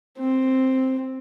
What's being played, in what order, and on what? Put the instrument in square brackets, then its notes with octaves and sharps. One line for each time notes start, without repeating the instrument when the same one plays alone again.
[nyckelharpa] C4